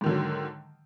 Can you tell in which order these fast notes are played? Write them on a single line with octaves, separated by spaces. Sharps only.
G#2 D#3 D3 F#3